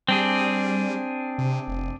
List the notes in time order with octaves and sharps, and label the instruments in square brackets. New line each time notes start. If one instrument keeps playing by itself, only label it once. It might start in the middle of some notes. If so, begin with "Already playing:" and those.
[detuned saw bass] G3 [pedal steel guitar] C4 D4 G#4
[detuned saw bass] C3
F1